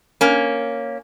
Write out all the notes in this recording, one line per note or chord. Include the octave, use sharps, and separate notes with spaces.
A#3 C#4